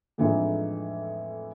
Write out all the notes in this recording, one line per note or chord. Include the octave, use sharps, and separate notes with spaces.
F2 A2 E3 G#3 D4 D#4